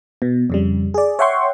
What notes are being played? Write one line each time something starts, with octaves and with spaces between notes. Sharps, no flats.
B2
F2 C#3 G3
G#4 D5
C#5 E5 F#5 G5 C6 C#6